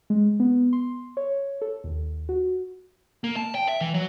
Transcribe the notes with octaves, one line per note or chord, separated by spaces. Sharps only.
G#3
B3
C6
C#5
A4
D#2
F#4
A#3
A5
G5
E5
E3
F#3